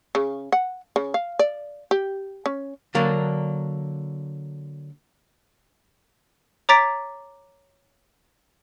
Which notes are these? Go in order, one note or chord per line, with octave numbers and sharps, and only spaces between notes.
C#3
F#5
C#3
F5
D5
G4
C#4
D3 F#3 A#3 D4
C#5 A#5 D6 A6 B6 D7